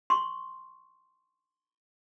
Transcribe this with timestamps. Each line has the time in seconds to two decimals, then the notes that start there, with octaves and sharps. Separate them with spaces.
0.10 C6 C#6